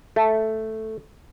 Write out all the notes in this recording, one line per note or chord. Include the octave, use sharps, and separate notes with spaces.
A3